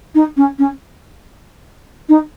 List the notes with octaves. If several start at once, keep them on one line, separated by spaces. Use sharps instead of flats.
D#4
C#4
C#4
D#4